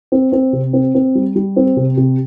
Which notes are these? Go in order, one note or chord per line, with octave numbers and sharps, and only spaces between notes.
C4
C4
C3
C4
C4
G3
G3
C4
C3
C3